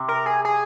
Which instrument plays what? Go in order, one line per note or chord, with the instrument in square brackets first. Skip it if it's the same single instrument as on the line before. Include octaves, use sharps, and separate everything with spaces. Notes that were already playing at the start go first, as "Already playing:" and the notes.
Already playing: [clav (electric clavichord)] C3
[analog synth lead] A#4
G#4
G#4